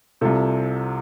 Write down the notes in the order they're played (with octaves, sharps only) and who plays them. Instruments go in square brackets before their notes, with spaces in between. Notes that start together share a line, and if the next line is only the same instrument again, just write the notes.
[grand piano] C2 C3 F4 A4